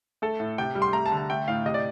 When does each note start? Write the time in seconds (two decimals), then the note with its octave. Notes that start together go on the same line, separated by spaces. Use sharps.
0.22 A3 A4
0.40 A2
0.58 C3 G5
0.75 G3
0.82 C6
0.93 A3 A#5
1.06 A5
1.12 D3
1.17 A5
1.30 A3 G5
1.48 A2 F5
1.66 C3 D#5
1.74 D5